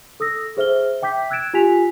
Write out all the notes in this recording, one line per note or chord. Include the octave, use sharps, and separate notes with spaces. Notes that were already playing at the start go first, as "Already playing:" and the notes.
A4 D#6 E6 A#6
G#4 C5 E5 F6 G7
E5 G5 D6 G6 B6
E6 F#6 G#6 A6 D7 E7
F4 G4 G#5 B6 F7